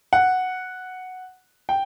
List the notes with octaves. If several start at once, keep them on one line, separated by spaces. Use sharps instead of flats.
F#5
G5